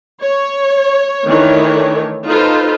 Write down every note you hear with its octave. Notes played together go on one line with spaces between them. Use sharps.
C#5
D#3 E3 A3 D4 C#5
D#4 F4 A4 B4 C5